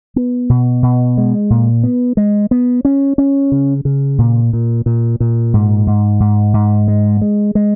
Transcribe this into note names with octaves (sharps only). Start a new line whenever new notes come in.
B3
B2
B2
G#3
A#2
B3
G#3
B3
C#4
C#4
C#3
C#3
A#2
A#2
A#2
A#2
G#2
G#2
G#2
G#2
G#3
G#3
G#3